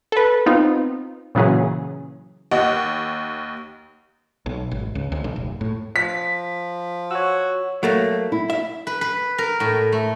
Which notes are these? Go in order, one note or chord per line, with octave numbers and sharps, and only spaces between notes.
A4 B4
B3 C4 D#4 F4
A#2 C#3 E3 F#3 C#4 G#4
D#2 D#5 F#5
B1
G#1
C#2
D2
B1
F1
A2
F3 B6
F#4 C#5 E6
F#3 A3 A#3
E4
E5
B4
B4
A#4
A2
A3